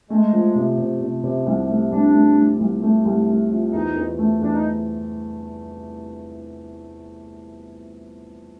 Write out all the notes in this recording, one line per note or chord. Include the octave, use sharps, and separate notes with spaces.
G#3 A3
F3
C3
C3
C3
C3
C2
A3
C2 D4
A3
A3
C2
A3
C2
A3
F3
E2 D#4
E2
A3
E2 D4
D#4